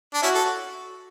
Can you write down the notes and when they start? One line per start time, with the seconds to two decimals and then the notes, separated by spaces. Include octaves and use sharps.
0.14 D4
0.22 C#4 E4 F#4
0.35 A4